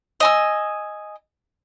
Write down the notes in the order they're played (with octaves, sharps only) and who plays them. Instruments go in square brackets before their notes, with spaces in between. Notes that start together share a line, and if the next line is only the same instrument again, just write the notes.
[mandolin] D#5 G#5 E6